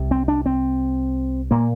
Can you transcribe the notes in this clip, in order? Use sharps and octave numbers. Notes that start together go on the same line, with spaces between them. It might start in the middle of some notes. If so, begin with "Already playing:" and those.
Already playing: C2 C3
C4
D4
C4
A#2 A#3